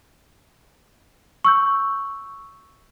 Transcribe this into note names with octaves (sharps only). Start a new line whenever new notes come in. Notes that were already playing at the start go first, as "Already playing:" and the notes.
C#6 E6 G6